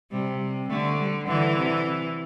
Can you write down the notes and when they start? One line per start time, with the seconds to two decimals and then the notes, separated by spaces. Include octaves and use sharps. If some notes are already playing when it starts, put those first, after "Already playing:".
0.11 C3 G3
0.69 D3 A3
0.99 G3
1.28 D3 E3
1.56 C3